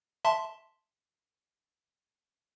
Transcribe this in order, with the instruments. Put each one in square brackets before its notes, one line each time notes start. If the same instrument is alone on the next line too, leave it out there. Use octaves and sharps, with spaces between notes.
[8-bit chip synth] E5 A5 C6